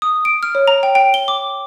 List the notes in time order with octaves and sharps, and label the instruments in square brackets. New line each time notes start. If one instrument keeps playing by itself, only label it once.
[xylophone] D#6
D7
F6
C#5
A#5
G5
G5
G7
D6